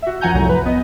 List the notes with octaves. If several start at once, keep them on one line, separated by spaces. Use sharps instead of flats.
F#4 E5
F#2 F3 F#5 G#5 A#5 G6
C2 A2 F#3 A#5
B4
B3 D#5